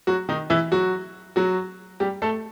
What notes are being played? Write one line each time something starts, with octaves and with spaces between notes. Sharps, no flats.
F#3 F#4
D#3 D#4
E3 E4
F#3 F#4
F#3 F#4
G3 G4
A3 A4